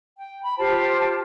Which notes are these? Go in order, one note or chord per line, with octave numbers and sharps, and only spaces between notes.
G5
B5
F4 G4 C5 A5